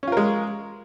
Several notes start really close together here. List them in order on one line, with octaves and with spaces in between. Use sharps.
C#4 F4 A#4 G#3